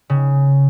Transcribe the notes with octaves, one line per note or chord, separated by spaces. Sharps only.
C#3